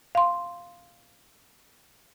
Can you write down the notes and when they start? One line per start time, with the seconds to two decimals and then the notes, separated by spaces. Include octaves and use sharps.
0.15 F5 C6